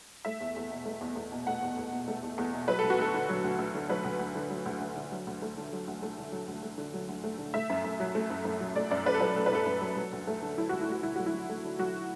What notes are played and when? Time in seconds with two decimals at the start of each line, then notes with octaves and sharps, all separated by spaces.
0.25 A3 E5
0.40 E2
0.56 E2
0.71 B2
0.85 A3
1.01 E2
1.16 E2
1.32 B2
1.47 A3 F#5
1.62 E2
1.78 E2
1.93 B2
2.08 A3
2.23 E2
2.38 E2
2.53 B2
2.68 F#3 B4
2.79 D2 A4
2.90 F#4
2.99 D2 A4
3.14 D3
3.29 F#3
3.44 D2
3.59 D2
3.74 D3
3.89 F#3 B4
4.04 D2
4.19 D2
4.35 D3
4.50 F#3
4.66 D2
4.80 D2
4.97 D3
5.12 F#3
5.27 D2
5.42 A3
5.57 D3
5.72 F#3
5.88 D2
6.02 A3
6.18 D3
6.32 F#3
6.48 D2
6.63 A3
6.78 D3
6.93 F#3
7.09 D2
7.24 A3
7.38 D3
7.54 A3 E5
7.70 F#2
7.84 F#2
8.00 F#3
8.15 A3
8.30 F#2
8.45 F#2
8.60 F#3
8.76 A3 D5
8.91 F#2 D5
9.06 F#2 B4
9.14 A4
9.20 F#3 B4
9.36 A3 A4
9.46 B4
9.52 F#2 A4
9.66 F#2
9.81 F#3
9.97 F#3
10.12 D2
10.27 A3
10.42 D3
10.57 F#3 E4
10.69 D2 F#4
10.81 E4
10.88 A3 F#4
11.03 D3 E4
11.16 F#3 F#4
11.26 E4
11.33 D2
11.49 A3
11.65 D3
11.79 F#3 F#4